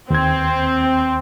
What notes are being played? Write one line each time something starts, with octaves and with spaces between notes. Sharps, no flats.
D#2 C4 G#6